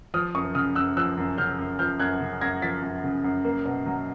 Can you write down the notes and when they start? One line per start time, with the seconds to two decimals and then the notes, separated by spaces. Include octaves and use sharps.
0.14 F3 D#6 F6
0.35 F#2 C#6 D#6
0.55 C#3 D#6 F6
0.75 F#2 E6 F#6
0.97 F3 E6 F#6
1.17 F#2
1.38 C#3 F6 G6
1.59 F#2
1.79 F3 F6 G6
2.00 F#2 F#6 G#6
2.21 C#3
2.41 F#2 G#6 A#6
2.62 F3 A6 B6
2.82 F#2
3.04 C#3
3.24 F#2
3.45 A#3
3.65 B2
3.86 F#3